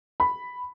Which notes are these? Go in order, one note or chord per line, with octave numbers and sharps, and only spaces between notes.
B5